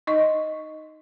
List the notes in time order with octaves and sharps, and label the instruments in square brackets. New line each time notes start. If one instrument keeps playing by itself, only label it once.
[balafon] D#4 D#5 C#6